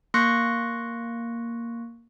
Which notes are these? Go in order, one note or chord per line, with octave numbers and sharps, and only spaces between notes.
A#3 C6 C#6 F#6 A#6 C#7